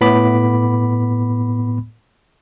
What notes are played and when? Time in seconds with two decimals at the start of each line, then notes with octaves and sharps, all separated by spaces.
0.01 A2 B3 B5 D6